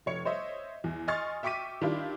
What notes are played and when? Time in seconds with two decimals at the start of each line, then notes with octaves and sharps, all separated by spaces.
0.06 F1 C#5 C#7
0.25 C5 C#5 D#5 E5
0.84 E2
1.08 D#5 G#5 C6 C#6 F6 A6
1.43 E5 G5 C#6 D6 B6 D#7
1.81 D#3 D4 E4 F4 G4